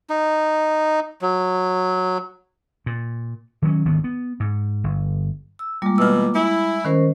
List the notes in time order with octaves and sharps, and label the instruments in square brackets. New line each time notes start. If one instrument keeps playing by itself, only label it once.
[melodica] D#4
F#3
[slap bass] A#2
D#3 F#3 G#3 C#4
G#1 D2 D#3 B3
B3
G#2
G1
[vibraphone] E6
[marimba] G3 G#3 [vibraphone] A#3 F4 D6
[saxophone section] B2 E3 [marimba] E6 F6
[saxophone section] E4 [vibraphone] G#5
[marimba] D#3 [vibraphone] C#4 A#4 C5